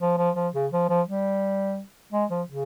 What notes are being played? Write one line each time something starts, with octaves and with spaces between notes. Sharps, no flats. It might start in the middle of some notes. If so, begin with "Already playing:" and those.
F3
F3
F3
C#3
F3
F3
G3
G#3
F3
C#3